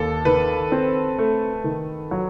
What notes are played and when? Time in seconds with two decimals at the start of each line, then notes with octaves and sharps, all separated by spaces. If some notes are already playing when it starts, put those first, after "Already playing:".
Already playing: D#2 A4
0.25 D#3 B4
0.72 C4
1.18 A3
1.64 D#3
2.11 F#3